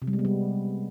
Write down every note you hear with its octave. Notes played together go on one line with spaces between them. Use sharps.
C3
G3
G#3
B3
G3